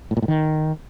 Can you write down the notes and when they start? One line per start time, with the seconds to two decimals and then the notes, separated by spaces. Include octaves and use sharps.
0.11 A2
0.17 A#2
0.22 A2
0.28 D#3